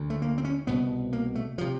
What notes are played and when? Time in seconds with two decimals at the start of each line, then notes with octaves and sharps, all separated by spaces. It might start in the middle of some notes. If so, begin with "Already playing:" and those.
Already playing: D2 D3
0.10 A3
0.22 A#3
0.38 C4
0.44 C#4
0.67 C2 B2 B3
1.13 A#3
1.35 A3
1.58 F3
1.61 C3